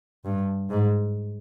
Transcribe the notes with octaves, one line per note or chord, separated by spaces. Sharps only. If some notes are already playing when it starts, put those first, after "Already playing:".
G2
G#2